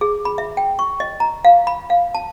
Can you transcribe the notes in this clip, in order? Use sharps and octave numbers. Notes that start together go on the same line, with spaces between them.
G#4
B5
E5
G5
C#6
D#5
A#5
F5
B5
F5
A5